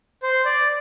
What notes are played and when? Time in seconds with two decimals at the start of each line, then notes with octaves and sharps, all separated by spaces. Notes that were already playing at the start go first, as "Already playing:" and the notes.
0.23 C5
0.45 D5